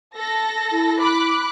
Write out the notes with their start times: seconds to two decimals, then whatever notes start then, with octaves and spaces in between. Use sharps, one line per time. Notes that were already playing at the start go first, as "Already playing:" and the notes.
0.15 A4 A#6
0.72 E4
1.00 B5 D6 F#6